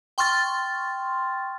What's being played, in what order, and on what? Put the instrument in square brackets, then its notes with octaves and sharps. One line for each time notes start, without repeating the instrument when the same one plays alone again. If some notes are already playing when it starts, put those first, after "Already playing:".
[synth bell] G5 C6 C#6 F6 A6